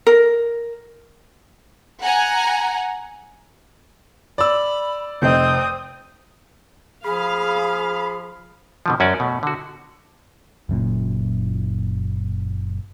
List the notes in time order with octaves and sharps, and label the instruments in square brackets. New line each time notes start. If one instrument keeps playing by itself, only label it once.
[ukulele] A#4
[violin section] F#5 G#5 A#5
[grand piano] D5 E6 [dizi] B5
[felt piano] F1 D#5 [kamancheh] C4 D#6 [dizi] G6
[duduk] F3 [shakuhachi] G#4 [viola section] F5 [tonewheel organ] B5
[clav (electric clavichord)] B2 D3 F3
F#2 C#4 F#4 D5
B2 A3
D3 F#4
[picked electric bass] F#1 F#2 A#2